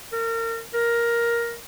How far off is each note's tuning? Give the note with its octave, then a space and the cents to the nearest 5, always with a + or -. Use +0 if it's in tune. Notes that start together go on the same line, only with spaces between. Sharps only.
A#4 -30
A#4 +10